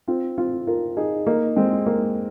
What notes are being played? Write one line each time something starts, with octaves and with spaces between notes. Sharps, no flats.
C4 F4
C4 F4
F4 A#4
D#4 G#4
A#3 D#4
G#3 C4
A#3